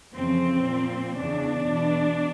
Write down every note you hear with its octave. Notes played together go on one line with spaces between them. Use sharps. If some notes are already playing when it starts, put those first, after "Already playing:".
F2 C#3 E3 C4
A#2 F3
E2 C#3 E3 D4
E2 B2